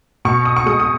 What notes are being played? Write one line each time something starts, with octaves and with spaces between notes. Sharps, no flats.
B2 C#6
D#6
C#6
G#3 D#6
D#6